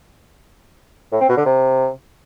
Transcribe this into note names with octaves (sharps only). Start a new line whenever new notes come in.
A2
C4
B2
D3
C3